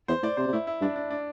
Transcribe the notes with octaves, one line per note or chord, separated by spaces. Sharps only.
E2 C5
A2 D5
C3 C5
C3
A2 E4
E4
G2 D4
D4
D4